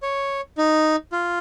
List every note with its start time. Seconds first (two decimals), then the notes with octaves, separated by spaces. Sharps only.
0.02 C#5
0.58 D#4
1.12 F4